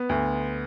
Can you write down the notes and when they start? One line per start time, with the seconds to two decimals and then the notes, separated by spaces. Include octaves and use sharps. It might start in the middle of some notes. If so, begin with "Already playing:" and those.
Already playing: B3
0.09 D2